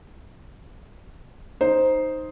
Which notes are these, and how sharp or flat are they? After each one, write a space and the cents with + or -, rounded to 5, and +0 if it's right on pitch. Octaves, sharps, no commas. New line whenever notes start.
D#4 +0 C5 +0